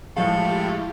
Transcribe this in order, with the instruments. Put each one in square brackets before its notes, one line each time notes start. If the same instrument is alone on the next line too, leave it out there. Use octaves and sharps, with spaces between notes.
[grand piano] A2 F3 G#3 [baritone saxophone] A3 [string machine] E4 F4 G4 [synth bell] F5